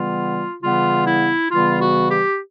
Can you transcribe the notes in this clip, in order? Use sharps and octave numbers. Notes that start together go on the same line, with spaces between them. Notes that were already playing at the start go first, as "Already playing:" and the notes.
Already playing: C#3 E3 G3 B3 F4
C#3 E3 G3 B3 F4
E4
C#3 E3 G3 B3 F4
F#4
G4